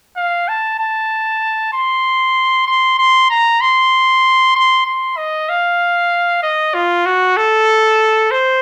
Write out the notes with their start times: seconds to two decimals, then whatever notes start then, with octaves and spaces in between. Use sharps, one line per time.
0.17 F5
0.48 A5
0.79 A5
1.73 C6
2.67 C6
2.99 C6
3.30 A#5
3.61 C6
4.55 C6
4.86 C6
5.17 D#5
5.49 F5
6.43 D#5
6.74 F4
7.06 F#4
7.37 A4
8.31 C5